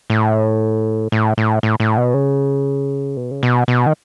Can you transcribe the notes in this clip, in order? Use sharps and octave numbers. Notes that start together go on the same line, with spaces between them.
A2
A2
A2
A2
A2
B2
C#3
B2
C#3
B2
B2
D#3